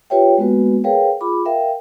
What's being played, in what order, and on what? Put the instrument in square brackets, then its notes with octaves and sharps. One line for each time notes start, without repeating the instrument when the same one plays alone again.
[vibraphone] F4 G4 B4 C#5 E5 G5
G#3 A#3 B3 F#4 B4
G#4 A#4 B4 C#5 F5 G5
F4 G#4 B5 D6
A#4 E5 F5 G5